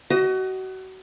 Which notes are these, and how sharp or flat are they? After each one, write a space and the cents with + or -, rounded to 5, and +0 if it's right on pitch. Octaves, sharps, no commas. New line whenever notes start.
F#4 +30 D#5 +0